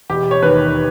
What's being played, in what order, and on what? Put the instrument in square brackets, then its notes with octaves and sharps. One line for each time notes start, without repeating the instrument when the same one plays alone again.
[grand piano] E1 [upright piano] G4
[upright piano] C#5
[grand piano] D#2 D#3 [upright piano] B4